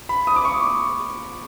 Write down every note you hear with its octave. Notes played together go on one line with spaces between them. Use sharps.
B5
D#6
D6
C#6